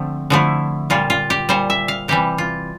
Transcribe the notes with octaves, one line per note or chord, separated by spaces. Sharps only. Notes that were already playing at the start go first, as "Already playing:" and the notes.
Already playing: D3 F3 A3 C4
D3 F3 A3 E4
A#2 G3 F4
F4
G4
A#2 G3 C5
E5
F5
C3 E3 G3 G4
F4